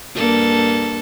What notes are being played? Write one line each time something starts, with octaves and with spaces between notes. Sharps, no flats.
G2 A#3 A4